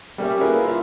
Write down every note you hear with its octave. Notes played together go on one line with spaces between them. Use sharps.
G3 A#3 C#4 G4 C#5 E5
E4 F#4 G#4 A#4 B4 F5
F4 E5 F5